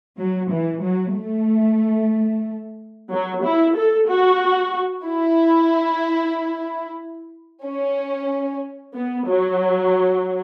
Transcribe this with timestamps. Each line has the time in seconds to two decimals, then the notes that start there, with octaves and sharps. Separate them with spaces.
0.19 F#3
0.52 E3
0.84 F#3
1.16 A3
3.11 F#3
3.43 E4
3.75 A4
4.08 F#4
5.05 E4
7.64 C#4
8.95 B3
9.27 F#3